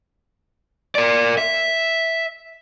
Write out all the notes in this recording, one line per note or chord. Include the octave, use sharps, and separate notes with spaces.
A#4 D5
E5